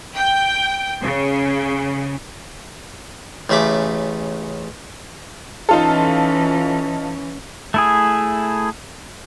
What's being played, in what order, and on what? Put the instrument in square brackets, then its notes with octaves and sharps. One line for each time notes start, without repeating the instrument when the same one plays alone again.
[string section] G5
C#3
[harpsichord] A1 C#3 A3 B5 D6
[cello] E3 C#4 [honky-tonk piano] D#4 F4 A4
[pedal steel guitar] A3 E4 G#4